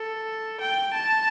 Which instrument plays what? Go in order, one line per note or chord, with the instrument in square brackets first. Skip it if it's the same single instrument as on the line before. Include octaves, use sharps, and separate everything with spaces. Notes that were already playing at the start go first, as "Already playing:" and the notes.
Already playing: [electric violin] A4
G5
A5